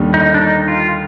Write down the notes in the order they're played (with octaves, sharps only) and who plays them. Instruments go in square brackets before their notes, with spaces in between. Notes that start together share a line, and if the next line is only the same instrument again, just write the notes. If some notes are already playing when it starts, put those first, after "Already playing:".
Already playing: [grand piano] D#2 D3 G3
[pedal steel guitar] D#4
D4
D#4
F4